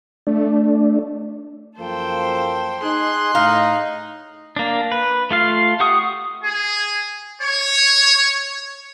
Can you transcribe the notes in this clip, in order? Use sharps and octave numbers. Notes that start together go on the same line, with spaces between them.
A3 D4
F#2 F3 A#3 A4 C5 G5
D#4 G#4 C6 F#6
A2 D#4 F5
A#3 D4
B4
A3 F4 F5
G4 F#5 C#6 D#6
G#4
C#5